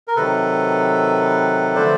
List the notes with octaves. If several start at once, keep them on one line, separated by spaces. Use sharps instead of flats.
A#4
C3 D#3 F#3 A4 B4
D3 F3 A3 C5 D5